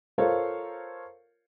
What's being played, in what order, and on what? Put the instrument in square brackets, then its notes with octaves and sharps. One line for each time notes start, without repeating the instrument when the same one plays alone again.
[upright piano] F4 A4 A#4 C5 C#5 F5